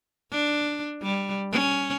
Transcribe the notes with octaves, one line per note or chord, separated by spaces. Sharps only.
D4
G3
C#4